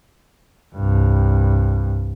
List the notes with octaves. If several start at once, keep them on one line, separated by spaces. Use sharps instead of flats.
C2 G2